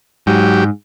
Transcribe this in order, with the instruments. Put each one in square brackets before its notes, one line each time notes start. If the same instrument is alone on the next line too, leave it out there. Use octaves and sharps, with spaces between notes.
[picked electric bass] G#2 [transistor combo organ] F#3 G4